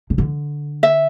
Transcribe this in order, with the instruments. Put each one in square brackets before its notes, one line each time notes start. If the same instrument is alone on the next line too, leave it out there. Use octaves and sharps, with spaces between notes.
[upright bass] C#3
D3
[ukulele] E5